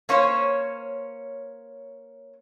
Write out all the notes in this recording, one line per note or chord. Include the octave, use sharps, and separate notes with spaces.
A#3 C#4 C5 C#5